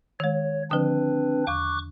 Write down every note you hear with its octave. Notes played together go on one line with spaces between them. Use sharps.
D#3 G#3 C#5
D3 F3 C4 D4 B4
E2 C#6 D6 F#6